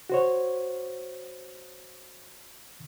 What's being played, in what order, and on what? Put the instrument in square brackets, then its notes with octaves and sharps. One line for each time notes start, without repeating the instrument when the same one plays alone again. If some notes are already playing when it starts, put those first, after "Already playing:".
[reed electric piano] F#4 C5 C#5